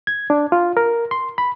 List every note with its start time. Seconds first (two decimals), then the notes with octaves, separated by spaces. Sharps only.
0.07 G#6
0.30 D4
0.52 F4
0.77 A#4
1.11 C6
1.38 B5